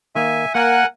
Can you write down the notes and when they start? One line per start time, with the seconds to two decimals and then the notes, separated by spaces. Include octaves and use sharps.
0.15 D#3 A#3 E5 G#5
0.55 A#3 A#4 F#5 G#5